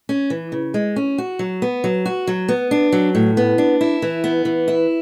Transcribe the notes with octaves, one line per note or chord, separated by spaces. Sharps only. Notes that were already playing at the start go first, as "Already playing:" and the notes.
C#4
E3
C#3
G#3
C#4
F#4
F#3
B3
F#3
F#4
F#3
B3
D4
F#3
A2
B3
D4
E4
E3
B3
E3
E4